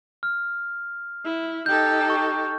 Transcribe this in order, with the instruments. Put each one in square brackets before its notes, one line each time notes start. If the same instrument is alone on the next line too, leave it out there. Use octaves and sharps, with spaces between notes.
[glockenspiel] F6
[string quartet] E4
[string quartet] D#4 G4 A4 [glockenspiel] G6
[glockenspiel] C#6